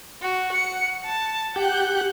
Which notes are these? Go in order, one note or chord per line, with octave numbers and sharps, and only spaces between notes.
F#4
F#5 C#7
A5
G4 F#5 F#6 G6